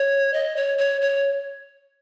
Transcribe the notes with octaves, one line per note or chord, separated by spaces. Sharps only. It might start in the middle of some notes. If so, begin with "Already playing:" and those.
Already playing: C#5
D#5
C#5
C#5
C#5